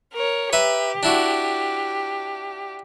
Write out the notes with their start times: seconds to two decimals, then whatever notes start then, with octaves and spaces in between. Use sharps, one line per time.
0.13 A#4 C#5
0.53 G4 B4 E5 A#5
1.03 D4 E4 F#4